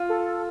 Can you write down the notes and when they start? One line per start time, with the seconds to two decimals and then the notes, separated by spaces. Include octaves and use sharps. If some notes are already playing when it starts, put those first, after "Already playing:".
Already playing: F4
0.09 A4